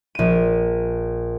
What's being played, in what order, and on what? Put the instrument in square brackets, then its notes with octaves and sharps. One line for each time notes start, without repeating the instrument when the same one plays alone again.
[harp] A#1 D#7